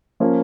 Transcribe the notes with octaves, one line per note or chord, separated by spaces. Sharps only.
F3 A#3 C#4